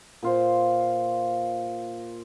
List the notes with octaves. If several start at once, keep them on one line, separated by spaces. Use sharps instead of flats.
A#2 F4 C5